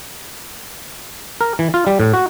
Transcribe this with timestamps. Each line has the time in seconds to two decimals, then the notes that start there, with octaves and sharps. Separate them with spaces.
1.41 A#4
1.59 E3
1.74 F4
1.87 G3
2.00 A2
2.13 F#4